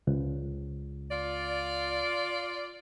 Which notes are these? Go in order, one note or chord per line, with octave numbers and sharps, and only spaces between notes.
C#2
F4 D5